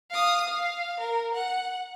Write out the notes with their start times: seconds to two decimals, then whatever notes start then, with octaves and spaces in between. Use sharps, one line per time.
0.10 F5 D#6
0.49 F5
1.00 A#4
1.35 F#5